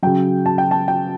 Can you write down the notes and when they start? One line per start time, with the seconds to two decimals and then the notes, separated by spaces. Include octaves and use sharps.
0.03 C#3 F#3 G5
0.46 A5
0.58 G5
0.71 A5
0.88 G5